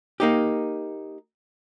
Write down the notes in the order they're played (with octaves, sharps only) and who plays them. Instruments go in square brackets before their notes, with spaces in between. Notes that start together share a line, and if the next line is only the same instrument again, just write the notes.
[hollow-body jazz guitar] A#3 D#4 G4